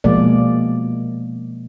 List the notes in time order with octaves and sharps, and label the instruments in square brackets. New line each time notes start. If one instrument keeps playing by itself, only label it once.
[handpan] B2 F3 G#3 A#3 D5